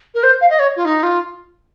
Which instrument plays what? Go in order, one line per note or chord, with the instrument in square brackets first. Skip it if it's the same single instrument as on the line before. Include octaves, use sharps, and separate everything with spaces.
[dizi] A#4
C5
F5
D#5
C#5
F4
D#4
F4